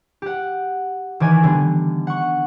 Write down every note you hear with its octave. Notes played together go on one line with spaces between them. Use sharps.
G4 F#5
D#3 E3 D5 G#5
D3 G3 B3
F#5 C#6